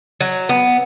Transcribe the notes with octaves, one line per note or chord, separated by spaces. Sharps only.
F#3
B3